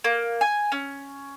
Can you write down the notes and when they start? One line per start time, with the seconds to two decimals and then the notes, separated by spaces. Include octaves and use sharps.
0.04 A#3
0.41 G#5
0.72 C#4